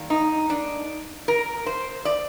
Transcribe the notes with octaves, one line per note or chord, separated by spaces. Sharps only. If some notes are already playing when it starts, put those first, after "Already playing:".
Already playing: D#3 G3 A#3
D#4
D4
A#4
C5
D5